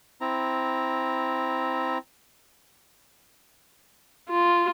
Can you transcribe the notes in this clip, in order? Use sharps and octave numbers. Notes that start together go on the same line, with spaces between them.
C4 E4 A#5
F4